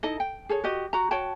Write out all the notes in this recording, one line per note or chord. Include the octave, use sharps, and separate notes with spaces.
D#4 E4 A4 D#5
G5
G#4 A4 C#5
F#4 G4 D#5
F#4 A#5
F#4 C#5 G5 A5